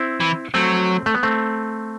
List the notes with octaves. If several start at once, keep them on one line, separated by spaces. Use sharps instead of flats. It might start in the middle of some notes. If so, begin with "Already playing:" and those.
Already playing: C4 E4
E3
F#3 A3 C4
A3
B3
A3 C4